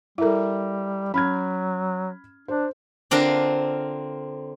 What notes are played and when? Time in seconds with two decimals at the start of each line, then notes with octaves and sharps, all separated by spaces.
0.18 G3 E4 A4 A#4 E5
1.14 F#3 C#4 B5 F6 G#6
2.48 D4 C5
3.11 D3 C4 D4 F4 A#4